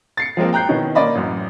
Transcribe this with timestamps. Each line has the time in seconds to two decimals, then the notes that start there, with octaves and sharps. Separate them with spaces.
0.17 A6 C7 C#7
0.37 F3 G#3 A#3 C4
0.53 G5 A#5 F#6 G6 C7
0.69 B2 D#3 C#4 D#4 E4
0.95 A#3 C#4 D5 D#5 B5
1.15 A1 F#2